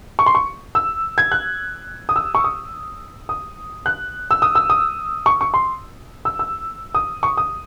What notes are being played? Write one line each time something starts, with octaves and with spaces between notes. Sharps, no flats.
C#6
C6
C#6
E6
G#6
F#6
D#6
E6
C#6
D#6
D#6
F#6
E6
D#6
E6
D#6
C#6
C#6
C6
E6
E6
D#6
C#6
D#6